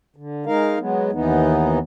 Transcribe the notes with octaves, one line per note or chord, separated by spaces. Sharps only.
D3
G#3 D#4 A#4 F5
F#3 G#3 B3
D#2 E3 B3 D#4